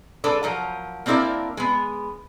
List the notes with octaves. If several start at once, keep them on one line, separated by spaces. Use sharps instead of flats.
G#3 D4 A4 B4 D5
F3 F#3 A#4
A#3 C4 D4 E4 A#4 D5
G#3 B3